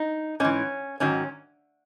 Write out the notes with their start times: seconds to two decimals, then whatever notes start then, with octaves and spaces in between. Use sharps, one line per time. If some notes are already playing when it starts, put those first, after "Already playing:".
Already playing: D#4
0.40 G#2 E3 C#4
1.00 G#2 D#3 F#3 C#4